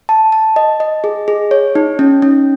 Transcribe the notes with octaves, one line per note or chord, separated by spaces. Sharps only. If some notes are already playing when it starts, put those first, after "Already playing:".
A5
A5
D#5
D#5
G#4
G#4
C#5
D#4
C#4
C#4